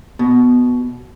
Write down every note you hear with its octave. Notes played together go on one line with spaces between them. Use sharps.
B2